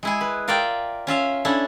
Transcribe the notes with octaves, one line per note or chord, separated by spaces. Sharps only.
G#3 E4 G#4
B4
F4 A#4 D5 E5 G5
C#4 F4 E5 F5
C#4 D4 E4 A4